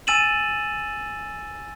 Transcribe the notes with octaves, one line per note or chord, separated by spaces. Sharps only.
G#5 E6 A6 D#7 E7 F#7